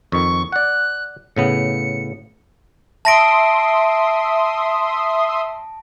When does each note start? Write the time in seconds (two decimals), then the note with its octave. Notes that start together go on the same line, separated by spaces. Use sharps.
0.12 F2 D#3 C#6
0.52 D5 F#5 F#6
1.36 A2 C#3 B3 C#7
3.05 E5 A5 C6 D#6 A#6 D7